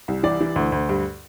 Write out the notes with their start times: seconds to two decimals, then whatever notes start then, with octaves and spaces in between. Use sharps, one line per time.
0.08 C2
0.23 E3 D5
0.41 E3
0.56 D2
0.72 D2
0.89 G2